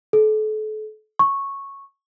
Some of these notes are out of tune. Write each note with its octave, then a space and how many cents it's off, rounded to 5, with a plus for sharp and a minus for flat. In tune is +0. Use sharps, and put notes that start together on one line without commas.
A4 -35
C#6 -10